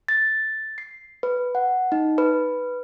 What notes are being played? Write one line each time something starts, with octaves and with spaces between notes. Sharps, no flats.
A6
C7
B4
F#5
D#4
B4